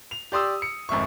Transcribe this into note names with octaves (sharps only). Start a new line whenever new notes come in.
F7
G4 D5 C6 D#6 E6
C#7
G#1 F2 E5 C#6